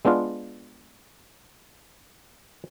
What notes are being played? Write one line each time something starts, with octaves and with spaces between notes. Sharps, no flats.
G#3 B3 D4 F4